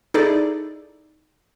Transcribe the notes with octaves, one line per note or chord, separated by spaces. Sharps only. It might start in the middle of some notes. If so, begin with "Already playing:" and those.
D#4 E4 G#4 A4 D5